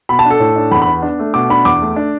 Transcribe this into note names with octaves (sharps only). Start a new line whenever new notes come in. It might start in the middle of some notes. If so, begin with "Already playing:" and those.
B2 B5
A5
D4
A4
A2
D4
E2 B5
B5
B3
D4
A3
B2 D6
D4 B5
E2 D6
A3
D4